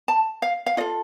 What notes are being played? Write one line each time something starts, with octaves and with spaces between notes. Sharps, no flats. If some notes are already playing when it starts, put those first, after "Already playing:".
A5
F5
F5
F4 A4 D#5